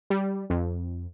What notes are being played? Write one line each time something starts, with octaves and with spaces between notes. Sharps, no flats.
G3
F2